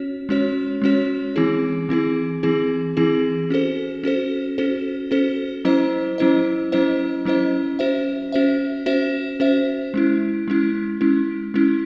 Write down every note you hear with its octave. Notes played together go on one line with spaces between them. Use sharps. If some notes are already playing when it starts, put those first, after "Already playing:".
Already playing: C#4 F#4 C#5
G#3 C#4 F#4 C#5
G#3 C#4 F#4 C#5
E3 C4 E4 G#4
E3 C4 E4 G#4
E3 C4 E4 G#4
E3 C4 E4 G#4
C#4 F#4 A4 C5
C#4 F#4 A4 C5
C#4 F#4 A4 C5
C#4 F#4 A4 C5
F#3 C#4 E4 C5 D#5
F#3 C#4 E4 C5 D#5
F#3 C#4 E4 C5 D#5
F#3 C#4 E4 C5 D#5
C#4 F#4 C5 E5
C#4 F#4 C5 E5
C#4 F#4 C5 E5
C#4 F#4 C5 E5
G#3 C#4 E4
G#3 C#4 E4
G#3 C#4 E4
G#3 C#4 E4